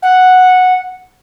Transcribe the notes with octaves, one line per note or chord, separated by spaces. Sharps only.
F#5